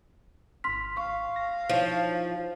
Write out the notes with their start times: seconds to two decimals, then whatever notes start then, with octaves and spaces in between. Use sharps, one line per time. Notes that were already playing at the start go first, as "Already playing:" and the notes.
0.64 G#1 C6 F6 B6
0.97 F5 C#6
1.36 A#6
1.69 F3 D#4 E4 C#5